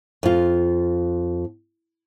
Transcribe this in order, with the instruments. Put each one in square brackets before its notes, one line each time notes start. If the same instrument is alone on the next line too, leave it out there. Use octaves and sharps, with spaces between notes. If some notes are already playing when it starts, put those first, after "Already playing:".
[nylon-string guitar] F2 F4